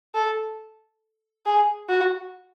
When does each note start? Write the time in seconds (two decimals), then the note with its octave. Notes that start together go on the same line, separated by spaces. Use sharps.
0.15 A4
1.46 G#4
1.89 F#4